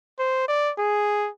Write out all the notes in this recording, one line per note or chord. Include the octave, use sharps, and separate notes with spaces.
C5
D5
G#4